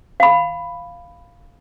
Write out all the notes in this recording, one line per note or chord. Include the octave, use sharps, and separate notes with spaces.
F5 B5